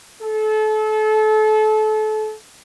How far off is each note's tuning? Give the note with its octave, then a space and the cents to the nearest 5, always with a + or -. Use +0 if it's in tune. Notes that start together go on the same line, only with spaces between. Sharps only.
A4 -30